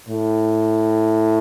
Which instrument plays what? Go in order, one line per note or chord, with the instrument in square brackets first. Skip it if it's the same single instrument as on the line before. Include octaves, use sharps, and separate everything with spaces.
[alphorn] A2